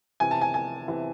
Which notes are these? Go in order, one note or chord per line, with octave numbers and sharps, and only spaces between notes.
C3 E3 G#5
A5
G#5
G#5
C3 E3